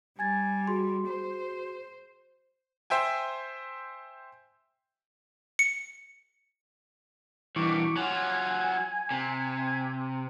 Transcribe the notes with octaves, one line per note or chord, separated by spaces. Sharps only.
G3 G#5 G#6 A6
F#4 G#4 C6
C5
C5 E5 G5 G#5
C#7
G2 B2 E3 C#6 D6
F#3 F4 G#5
C3